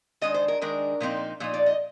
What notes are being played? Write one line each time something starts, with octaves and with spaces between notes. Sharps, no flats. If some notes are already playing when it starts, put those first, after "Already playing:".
D#3 G#3 D4 D#5
C5
A#4
D#3 G#3 D4 A#4
A#2 F3 C4 D#4
A#2 F3 D#4
D5
D#5